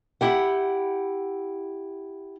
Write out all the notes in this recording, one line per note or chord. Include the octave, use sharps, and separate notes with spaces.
E4 G4 F#5